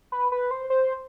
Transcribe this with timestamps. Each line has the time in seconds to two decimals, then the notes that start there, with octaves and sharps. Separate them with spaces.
0.12 B4
0.32 B4
0.51 C5
0.70 C5